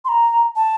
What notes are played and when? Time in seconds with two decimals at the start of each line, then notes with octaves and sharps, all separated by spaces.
0.05 C6
0.09 A#5
0.56 A5